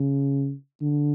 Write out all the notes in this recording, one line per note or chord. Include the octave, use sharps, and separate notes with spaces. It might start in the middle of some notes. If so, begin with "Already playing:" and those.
Already playing: C#3
D3